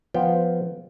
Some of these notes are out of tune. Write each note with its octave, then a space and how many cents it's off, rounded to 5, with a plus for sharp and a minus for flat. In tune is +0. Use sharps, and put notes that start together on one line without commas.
F3 +0 B3 +0 G5 +0